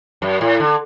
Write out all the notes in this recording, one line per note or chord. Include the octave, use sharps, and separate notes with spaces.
F#2
A2
D3